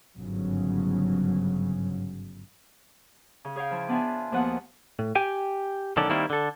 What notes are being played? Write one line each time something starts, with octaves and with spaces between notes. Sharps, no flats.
G1 G#2 C#3 F#3
C#3
G#4 C#5 F5 G5
F3 E4
B3 D4 F4 E5 G#5
D#2 F3 B3 B4 F#5 F#6
A2
G4 G5 G#5
B1 D3 D#3 C#4 A4 D5
D#3 G3 A#3 C4 E4
D3 A4